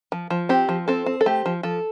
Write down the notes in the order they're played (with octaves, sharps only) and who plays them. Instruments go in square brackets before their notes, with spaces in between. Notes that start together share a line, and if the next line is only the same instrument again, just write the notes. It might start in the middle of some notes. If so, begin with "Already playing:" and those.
[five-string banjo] F3
F3
C4 G4
F3
C4 A4
C4
A4
A3 G4
F3
F3 A4